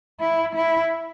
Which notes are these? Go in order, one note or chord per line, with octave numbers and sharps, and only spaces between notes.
E4
E4